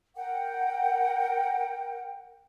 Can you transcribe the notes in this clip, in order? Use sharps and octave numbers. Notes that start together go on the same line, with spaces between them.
A#4 F#5 G5